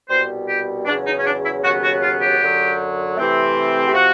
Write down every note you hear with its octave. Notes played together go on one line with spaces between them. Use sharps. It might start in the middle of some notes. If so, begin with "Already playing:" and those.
C2 B2 G3 C5
G4
E2 C#3 F#3 D4
D#4
C#4
D4
E4
D#2 C#3 F#3 B3 F#4
F#4
F4
G4
F#2 D3 F#3
C3 E3 A3 C4
G4
C3 F3 F#4